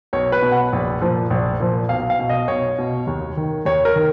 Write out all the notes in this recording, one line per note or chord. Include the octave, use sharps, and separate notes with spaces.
B1 C#5
B4
B2
F#5
A#1
A#2 F3
A#1
A#2 F3
B1 F5
F5
B2
D#5
B1 C#5
B2
D#2
D#3
D#2 C#5
A#4
D#3